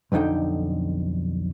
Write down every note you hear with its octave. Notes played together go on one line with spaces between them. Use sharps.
B1 F2 D3 D#4 G5